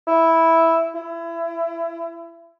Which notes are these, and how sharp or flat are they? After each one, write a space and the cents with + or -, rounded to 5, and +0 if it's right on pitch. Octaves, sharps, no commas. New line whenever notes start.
E4 -5
E4 +25